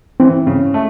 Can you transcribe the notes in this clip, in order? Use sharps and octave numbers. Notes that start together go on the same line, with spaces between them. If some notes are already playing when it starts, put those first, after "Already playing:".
E3 C4
C#3
A3